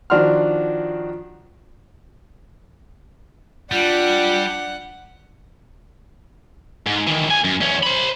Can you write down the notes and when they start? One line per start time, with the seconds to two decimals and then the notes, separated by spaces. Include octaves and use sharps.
0.10 D#3 F3 D4 F#4 C6 F6
3.72 G3 D4 F4 F#5
6.86 G#2
7.07 D#3 E3
7.30 D2 G#5
7.44 F#2
7.61 E2 C#4
7.83 C5 B5